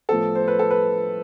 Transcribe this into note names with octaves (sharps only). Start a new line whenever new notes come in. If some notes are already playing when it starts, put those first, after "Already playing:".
A2 F3 B3 A4
C5
B4
A4
B4